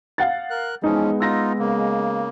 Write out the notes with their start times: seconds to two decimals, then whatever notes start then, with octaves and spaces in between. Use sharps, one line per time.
0.18 F5 F#5 A6
0.50 A#4 F#6
0.84 E3 F3 G#3 B3 C#4 D#4
1.20 D#4 F4 E6 A#6
1.59 C#3 A#3